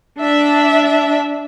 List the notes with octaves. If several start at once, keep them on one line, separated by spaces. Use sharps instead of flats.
D4 E5